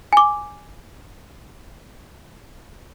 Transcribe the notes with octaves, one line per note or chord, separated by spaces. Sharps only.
G#5 D6